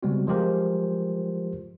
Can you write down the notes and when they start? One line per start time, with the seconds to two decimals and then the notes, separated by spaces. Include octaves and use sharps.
0.03 C#3 G3 G#3 B3 C4 F#4
0.27 F3 G#3 F4 G4 A#4 C5